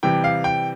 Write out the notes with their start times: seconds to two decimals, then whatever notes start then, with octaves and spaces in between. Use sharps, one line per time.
0.03 C3 E3 G3 G5
0.24 F5
0.44 G5